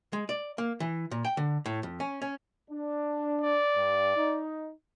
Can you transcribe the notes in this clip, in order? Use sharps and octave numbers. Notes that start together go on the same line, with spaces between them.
G#3
D5
A#3
E3
A#2
G5
D3
A2
F2
C#4
C#4
D4
D5
G2
D#4